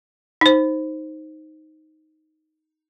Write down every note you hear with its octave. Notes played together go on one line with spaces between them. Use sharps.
D#4 C5